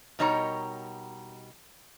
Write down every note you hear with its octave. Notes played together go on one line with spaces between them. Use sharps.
B2 G3 D#4 A#4 C#5 A#5